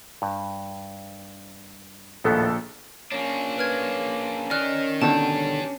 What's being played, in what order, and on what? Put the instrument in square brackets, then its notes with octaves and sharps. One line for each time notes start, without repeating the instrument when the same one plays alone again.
[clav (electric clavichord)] G2
[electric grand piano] A#1 A4 [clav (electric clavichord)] D#2 A2 B3
[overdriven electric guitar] A#3 D4 [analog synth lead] C#4
[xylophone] B4 F6 G#6
[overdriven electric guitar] D#3 D#4 [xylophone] D5 F6 F#6
[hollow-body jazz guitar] B2 D3 D#3 [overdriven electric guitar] D4 G4 [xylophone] A5